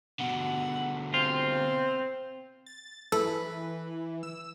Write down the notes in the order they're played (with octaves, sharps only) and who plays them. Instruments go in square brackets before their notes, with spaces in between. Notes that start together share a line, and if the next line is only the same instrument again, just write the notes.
[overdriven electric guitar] B2 D3 [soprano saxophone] F#5
[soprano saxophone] C4 [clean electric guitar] F4
[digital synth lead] A6
[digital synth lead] E3 [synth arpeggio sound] A4 [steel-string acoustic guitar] B4
[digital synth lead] E6